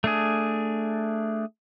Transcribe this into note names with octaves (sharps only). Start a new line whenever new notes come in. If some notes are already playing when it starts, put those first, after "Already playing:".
A3 D4 G#4